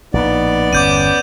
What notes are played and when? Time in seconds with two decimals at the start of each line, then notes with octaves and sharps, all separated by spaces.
0.14 A#1 A2 B3 D#4 D5
0.73 G1 E2 C#4 D6 G6 D#7